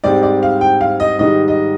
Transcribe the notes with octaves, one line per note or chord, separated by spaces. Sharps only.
G#2 G3 C4 D5
D5
F5
G5
F5
D#5
G#2 D#3 G3 D#5
D#5